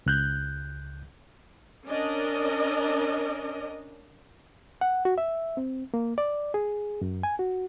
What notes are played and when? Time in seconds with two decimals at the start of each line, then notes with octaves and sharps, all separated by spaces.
0.06 C#2 F#6 G6
1.87 C#4 D4 A#4 D#5
4.81 F#5
5.05 F#4
5.18 E5
5.57 C4
5.94 A#3
6.18 D5
6.54 G#4
7.01 F#2
7.23 G#5
7.39 F#4